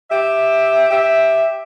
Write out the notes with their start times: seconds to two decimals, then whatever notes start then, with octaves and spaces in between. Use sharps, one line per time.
0.10 G4 E5
0.91 G4 E5